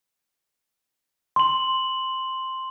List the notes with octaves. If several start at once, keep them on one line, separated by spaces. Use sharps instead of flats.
C6 F#7